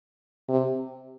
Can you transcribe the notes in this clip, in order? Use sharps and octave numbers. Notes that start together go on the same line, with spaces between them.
C3